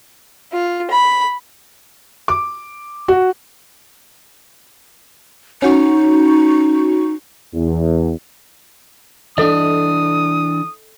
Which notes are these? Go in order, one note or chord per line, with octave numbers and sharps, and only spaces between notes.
F4
B5
D6
F#4
C#4 D#4 F#4 C#6
E2
E3 D4 A4 D#5 D#6